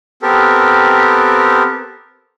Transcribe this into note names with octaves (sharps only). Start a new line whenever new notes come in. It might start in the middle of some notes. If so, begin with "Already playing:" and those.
B3 C4 G4 A4 A#4